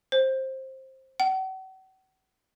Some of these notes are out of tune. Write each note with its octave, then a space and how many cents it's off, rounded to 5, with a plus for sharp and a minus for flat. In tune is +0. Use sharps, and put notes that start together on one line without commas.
C5 +15
F#5 +40